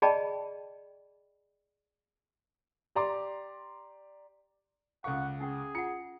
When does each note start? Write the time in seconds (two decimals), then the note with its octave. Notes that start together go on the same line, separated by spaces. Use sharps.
0.02 G#4 D5 D#5 G5 A5 B5
2.95 G4 D5 A#5 C6 D6
5.04 C#2 C#4 A4 F5 F#5 C#6
5.41 C#4 G#4 F#5 G5
5.75 F4 F#5 C#7